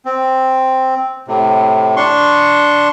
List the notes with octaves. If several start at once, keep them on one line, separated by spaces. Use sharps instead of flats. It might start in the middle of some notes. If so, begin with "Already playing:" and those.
C4
A2 C3
D4 C6 C#6